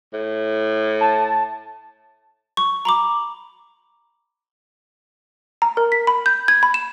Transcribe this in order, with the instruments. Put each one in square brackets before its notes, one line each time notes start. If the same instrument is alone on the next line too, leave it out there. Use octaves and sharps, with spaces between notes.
[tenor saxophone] A2
[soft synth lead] A5
[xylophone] C#6
A#5 B5 D6
A#5
A#4
B6
B5
G6
G#6
B5
E7